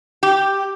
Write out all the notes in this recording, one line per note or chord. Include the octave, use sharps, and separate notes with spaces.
G4